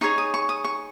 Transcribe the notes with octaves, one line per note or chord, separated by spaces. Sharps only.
D#4 G#4 C#5 C#6
D#6
C#6
D#6
C#6